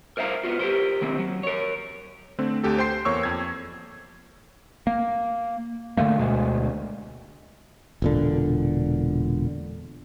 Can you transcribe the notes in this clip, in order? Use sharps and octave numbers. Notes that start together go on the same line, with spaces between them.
A#4 C5 E5 F5 A#5
B3 F4 F#4
G4 G#4 A#4 C5
D#3 A#3 C4
F#3
A#4 C#5
D3 A3 C4
D2 G4 A4
C5 G5 C6 C7
E2 A#3 C#5 C#6 E6
F2 G#6
A#3
D3 D#3 A3 A#3
D2 B2 D3 G#3
E1 A#2 D3